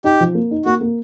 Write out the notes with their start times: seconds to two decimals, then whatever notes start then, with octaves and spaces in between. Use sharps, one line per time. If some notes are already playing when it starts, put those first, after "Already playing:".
0.04 D#4 G4
0.21 F3
0.35 A#3
0.51 D#4
0.65 A#3 F#4
0.81 A#3